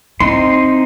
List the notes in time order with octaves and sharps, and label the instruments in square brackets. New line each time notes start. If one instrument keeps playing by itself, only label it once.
[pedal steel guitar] C4 D#4 C6 [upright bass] E4